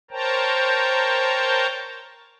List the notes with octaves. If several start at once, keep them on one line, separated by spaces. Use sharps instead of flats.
A#4 C5 C#5 G5 A5 A#5